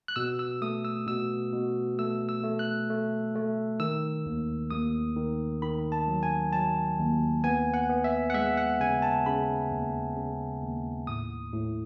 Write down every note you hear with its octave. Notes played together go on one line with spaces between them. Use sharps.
F#6
B2 E6
E6
A3 D#6
E6
B2 E6
B2
A3 E6
E6
A3
F#6
A3
A3
D#3 E6
D#2
D#2 D#6
D#3
D#3 B5
A5
F#3
G#5
F#3 A5
D#2
B3 G#5
F#5
B3
E5
F#5
G#3 E5
F#5
C#3 G#5
A5
C#3 B5
D#2
C#3
D#2
A2 D#6
A2